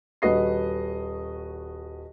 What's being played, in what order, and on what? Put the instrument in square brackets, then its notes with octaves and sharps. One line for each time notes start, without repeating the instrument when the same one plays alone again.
[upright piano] D#1 F#4 B4 D#5 C7